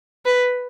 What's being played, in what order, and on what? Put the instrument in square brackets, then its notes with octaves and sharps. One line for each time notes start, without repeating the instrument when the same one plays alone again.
[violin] B4